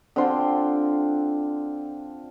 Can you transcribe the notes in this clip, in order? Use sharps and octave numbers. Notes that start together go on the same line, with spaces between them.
D3 C4 F4 C6